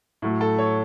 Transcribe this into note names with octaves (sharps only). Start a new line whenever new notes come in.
A2 F#3 A3
A4
C#5